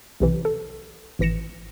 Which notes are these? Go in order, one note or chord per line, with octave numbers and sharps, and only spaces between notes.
B1 C3 E3
A4
G#1 A2 E3 A#6 C#7 E7